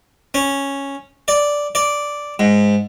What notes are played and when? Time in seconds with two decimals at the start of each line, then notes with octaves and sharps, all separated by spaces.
0.34 C#4
1.28 D5
1.75 D5
2.39 G#2